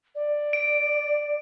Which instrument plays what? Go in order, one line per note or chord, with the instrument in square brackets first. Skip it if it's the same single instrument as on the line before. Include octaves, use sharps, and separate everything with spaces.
[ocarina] D5
[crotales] D7